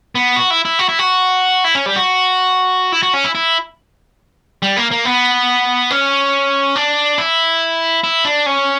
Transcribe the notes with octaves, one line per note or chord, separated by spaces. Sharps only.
B3
F#4
E4
E4
F#4
E4
F#4
E4
C#4
G3
F#4
E4
F#4
C#4
E4
E4
G3
A#3
A#3
B3
C#4
D4
E4
E4
D4
C#4